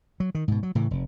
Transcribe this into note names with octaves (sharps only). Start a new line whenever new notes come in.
F#3
D#3
G#2 B2
F#3
A2 C#3 E3
F1